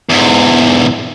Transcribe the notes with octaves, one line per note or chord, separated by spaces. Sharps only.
E2 G#2